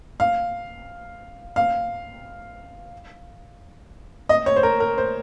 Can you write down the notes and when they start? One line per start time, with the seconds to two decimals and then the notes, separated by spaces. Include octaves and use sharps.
0.20 F5
1.56 F5
4.29 D#5
4.46 C#5
4.56 C5
4.63 A#4
4.80 A#4
4.98 C5